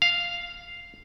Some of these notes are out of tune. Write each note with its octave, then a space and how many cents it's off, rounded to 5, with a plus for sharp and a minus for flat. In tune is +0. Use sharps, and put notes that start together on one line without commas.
F5 -5